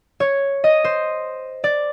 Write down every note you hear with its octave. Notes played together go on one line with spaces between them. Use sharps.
C#5
D#5
C5
D5